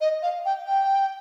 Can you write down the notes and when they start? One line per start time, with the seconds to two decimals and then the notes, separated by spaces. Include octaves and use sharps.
0.01 D#5
0.22 F5
0.45 G5
0.67 G5